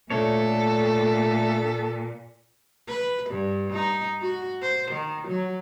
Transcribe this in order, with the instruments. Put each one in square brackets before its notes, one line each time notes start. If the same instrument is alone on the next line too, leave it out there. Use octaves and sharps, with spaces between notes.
[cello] A#2 [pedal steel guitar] A3 D4 C#5 [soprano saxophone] A4
[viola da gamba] B4
G2
D#4
F#4
C5
D#3
F#3